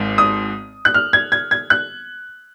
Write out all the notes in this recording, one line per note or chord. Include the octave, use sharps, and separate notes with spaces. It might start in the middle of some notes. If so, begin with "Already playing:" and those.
Already playing: G#1 G#2
D#6
F#6
F6
G#6
G#6
G#6
F#6